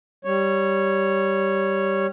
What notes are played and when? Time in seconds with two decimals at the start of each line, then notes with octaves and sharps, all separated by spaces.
0.25 G3 C#5